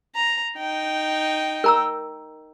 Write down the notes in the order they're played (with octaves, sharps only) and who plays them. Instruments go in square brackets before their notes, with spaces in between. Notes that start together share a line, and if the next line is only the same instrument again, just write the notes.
[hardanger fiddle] A#5
D#4 G5
[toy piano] A#4 A#5 E6